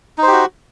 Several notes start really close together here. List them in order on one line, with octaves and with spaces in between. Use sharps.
D#4 C5 G4 F#4